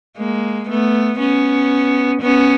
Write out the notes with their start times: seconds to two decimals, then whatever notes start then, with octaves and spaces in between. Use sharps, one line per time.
0.18 G#3 A#3
0.69 A3 B3
1.19 B3 C#4
2.21 B3 C#4